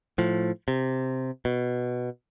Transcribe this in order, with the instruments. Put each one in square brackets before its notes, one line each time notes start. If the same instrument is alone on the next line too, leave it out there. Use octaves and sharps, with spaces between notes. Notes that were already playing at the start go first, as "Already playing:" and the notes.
[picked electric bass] A2 F3
C3
B2